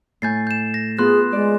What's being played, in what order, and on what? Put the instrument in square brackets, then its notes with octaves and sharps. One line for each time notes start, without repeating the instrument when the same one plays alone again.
[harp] A2 G#5 [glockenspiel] G6 A6 C7
[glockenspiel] G6 E7
A#6
[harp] B3 F4 [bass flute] G#4 [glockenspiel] C6 F#6
[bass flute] G#3 [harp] D5